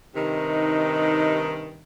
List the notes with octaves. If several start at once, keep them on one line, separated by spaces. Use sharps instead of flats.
G2 C3 D#3 D#4